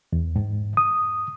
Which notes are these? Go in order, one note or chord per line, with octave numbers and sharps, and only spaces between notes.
E2
G#2
D#6